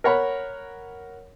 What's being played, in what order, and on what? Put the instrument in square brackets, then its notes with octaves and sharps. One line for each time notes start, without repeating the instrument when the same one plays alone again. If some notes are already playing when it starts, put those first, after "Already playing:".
[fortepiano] A#4 C#5 F#5 B5